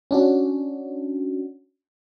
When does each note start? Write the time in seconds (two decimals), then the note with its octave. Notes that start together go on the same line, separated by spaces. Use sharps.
0.11 C#4 D4 F#4